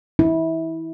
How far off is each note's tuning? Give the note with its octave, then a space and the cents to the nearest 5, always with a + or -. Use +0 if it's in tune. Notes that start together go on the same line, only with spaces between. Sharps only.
E4 -25